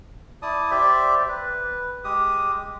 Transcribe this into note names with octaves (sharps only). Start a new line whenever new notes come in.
E4 D5 A5 D#6
G4 C5 D5 E5
B4
G#3 G4 D#6